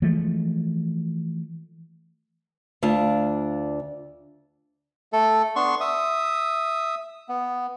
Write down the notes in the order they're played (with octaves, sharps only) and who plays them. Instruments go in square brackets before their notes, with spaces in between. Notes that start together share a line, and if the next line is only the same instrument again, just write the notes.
[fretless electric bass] E3 F3 G#3 A3
[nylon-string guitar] D2 D4 F4 F5
[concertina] A3 A4
B3 D4 C6 C#6
E5 D#6
B3